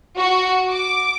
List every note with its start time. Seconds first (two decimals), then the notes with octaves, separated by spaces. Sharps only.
0.17 F#4
0.70 D6